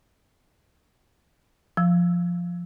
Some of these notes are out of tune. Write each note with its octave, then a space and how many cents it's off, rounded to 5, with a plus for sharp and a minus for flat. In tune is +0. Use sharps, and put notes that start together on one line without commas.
F3 +0 E6 +0